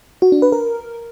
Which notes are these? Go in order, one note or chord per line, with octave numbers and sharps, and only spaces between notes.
F#4
D4
B4
A#4